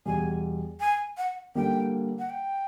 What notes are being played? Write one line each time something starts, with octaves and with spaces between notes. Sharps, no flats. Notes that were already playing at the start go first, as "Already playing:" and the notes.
E2 B2 G3 G#5
G#5
F#5
D3 G3 A#3 G5
F#5
G5